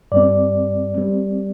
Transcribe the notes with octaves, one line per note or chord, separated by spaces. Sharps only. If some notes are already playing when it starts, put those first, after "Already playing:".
G2 G3 C4 D5
G3 C4